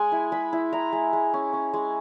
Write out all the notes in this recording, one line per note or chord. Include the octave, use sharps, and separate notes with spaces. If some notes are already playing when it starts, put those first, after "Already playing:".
Already playing: G#3 G#5
E4
G#3 B5
E4
E4 A#5
G#3
G#3
C#4
C#4
G#3